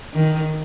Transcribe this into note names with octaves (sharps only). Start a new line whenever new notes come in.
D#3